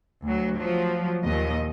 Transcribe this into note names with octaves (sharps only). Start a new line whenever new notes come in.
D2 F#3
F3 F#3
D#2 A#2 D#5